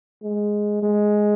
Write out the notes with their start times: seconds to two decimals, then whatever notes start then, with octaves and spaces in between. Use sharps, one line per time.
0.22 G#3
0.82 G#3